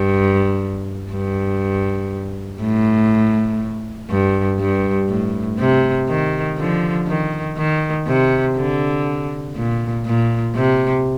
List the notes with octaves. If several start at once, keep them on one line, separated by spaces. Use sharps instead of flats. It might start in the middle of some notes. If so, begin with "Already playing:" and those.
Already playing: G2
G2
A2
G2
G2
A2
C3
D#3
D3 F3
D#3
D#3
C3
D3
A#2
A#2
C3